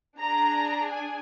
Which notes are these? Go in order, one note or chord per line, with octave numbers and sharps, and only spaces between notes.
D4 G#4 A#5
G#5